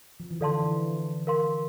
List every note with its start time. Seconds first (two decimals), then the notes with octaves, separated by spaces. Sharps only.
0.20 F3
0.31 E3
0.41 D3 A4 D5 F5 A5 C6
0.51 E3
0.62 E3
1.27 A#4 F5 C6